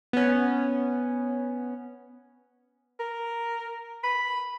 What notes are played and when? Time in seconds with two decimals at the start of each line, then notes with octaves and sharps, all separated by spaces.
0.13 B3 C#4
2.99 A#4
4.03 B5